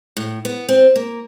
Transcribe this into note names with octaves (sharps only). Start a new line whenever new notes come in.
A2
B3
C4
A#3